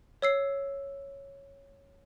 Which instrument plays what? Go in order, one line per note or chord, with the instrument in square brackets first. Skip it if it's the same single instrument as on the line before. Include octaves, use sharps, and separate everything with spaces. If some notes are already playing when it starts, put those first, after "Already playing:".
[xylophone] C#5 E6 C7